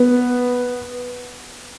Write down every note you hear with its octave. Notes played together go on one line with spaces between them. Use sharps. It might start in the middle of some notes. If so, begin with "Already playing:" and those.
Already playing: B3